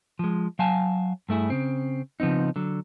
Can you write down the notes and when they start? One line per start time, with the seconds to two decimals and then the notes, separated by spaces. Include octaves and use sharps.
0.19 F3 G#3
0.59 F#3 F5 G#5 A5
1.29 G2 A3 E4 G#4
1.50 C#3 C4
2.20 C#3 F3 B3 C4 D#4
2.56 D3 F#3